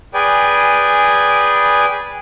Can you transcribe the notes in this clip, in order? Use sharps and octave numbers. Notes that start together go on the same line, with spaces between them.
G#4 B4 D5 G5 G#5